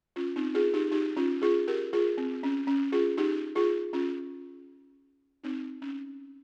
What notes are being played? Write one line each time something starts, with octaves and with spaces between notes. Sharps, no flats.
C#4 F4
C4 D#4
F4 G#4
D#4 G4
D#4 G4
C#4 F4
F4 G#4
G4 A#4
F4 G#4
C4
C#4
C#4
F4 G#4
D#4 G4
F4 G#4
C#4 F4
C4 D#4
C#4